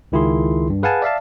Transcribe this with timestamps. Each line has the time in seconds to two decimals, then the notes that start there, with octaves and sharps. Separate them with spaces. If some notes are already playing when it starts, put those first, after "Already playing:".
0.12 C#2 D#3 E4 F4 G#4 C6
0.70 G2
0.83 G#4 B4 F5 F#5 G#5 A5
1.02 D5 E5 F5 A5